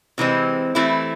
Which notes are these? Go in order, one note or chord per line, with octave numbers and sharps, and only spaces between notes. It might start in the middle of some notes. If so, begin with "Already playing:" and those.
C3 E3 G#3 C4
E3 A3 C4 E4